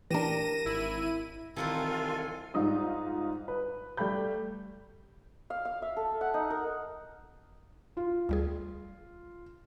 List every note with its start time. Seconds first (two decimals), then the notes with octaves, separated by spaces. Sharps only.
0.11 E3 D4 G4 A#4 A#6 D#7 E7
0.65 G#1 E4 D#7
1.56 C2 D#3 E3 C4 F4 A4 G#5
2.54 G#2 G3 D#4 F4 D#6
3.48 B4
3.97 G3 A3 G4 B5 G6
5.50 F5
5.65 F5
5.82 E5
5.96 A4
6.21 F#5
6.34 D#4
6.50 A#4
7.97 F4
8.29 D2 G3 G#4